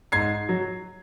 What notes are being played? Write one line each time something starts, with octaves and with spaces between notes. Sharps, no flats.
G#2 G#6 C7
F#3